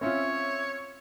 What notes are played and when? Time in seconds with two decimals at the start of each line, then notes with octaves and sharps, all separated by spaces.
0.01 C4 C#4 F4 C#5 E5